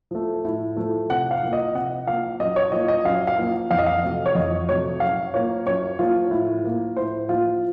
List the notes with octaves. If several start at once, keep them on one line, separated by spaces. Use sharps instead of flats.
F3 A3
A2
F3 A3
C3 F#5
F5
F3 A#3
D#5
C3 F#5
F3 A#3 F5
F#2 D#5
C#5
F3 A#3 D#5
D#5
F#2 F5
F5
F3 A#3
F2 F5
D#5
F5
C3 F#3 A3
C#5
F2 D#5
C3 F#3 A3 C#5
F#2 F5
F3 A#3 C#5
F#2 C#5
F3 A#3 F4
A2
F3 A#3
A2 C5
F3 A#3 F4